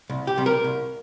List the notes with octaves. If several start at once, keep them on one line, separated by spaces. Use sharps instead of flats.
C2
G4
C3 G3
A#4
C2